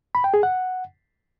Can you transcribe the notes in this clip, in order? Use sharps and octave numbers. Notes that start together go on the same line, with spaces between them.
B5
G5
G#4
F#5